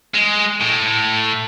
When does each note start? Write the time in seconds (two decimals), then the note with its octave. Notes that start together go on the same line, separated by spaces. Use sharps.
0.14 G#3
0.61 A2